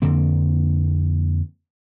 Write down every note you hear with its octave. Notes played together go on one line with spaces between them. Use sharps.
F2 D3 A#3 C4